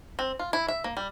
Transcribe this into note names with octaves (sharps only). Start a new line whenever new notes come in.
C4
F4
E4
E5
A#3
G3